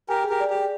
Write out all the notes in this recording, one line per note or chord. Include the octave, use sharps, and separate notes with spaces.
G4 A#4 G#5
G#4
G4 A#4
D5
G4 G#4